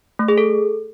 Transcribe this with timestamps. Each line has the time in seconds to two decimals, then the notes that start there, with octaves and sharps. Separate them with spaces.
0.19 A3
0.28 G#4
0.38 A4